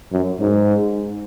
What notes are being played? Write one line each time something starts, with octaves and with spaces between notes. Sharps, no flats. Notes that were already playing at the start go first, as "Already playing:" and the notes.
F#2
G#2